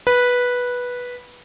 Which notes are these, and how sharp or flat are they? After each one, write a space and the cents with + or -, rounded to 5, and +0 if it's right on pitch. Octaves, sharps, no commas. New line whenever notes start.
B4 -10